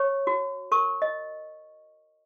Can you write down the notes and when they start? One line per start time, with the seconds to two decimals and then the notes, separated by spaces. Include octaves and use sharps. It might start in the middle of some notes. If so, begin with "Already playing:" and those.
Already playing: C#5 C#6
0.27 F#4
0.72 A#4 C#6
1.02 D#5